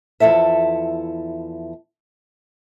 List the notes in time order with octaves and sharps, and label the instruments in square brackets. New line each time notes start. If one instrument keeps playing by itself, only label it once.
[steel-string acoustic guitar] E2 F3 E4 A4 E5